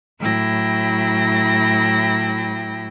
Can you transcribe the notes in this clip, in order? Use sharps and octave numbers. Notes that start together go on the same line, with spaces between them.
A2 F#3 E4 G5 A#6